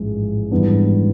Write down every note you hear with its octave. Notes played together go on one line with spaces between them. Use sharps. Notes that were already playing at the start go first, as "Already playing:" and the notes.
Already playing: A1 G#2 F3 G#3
G#2 E3 G3 B3 D4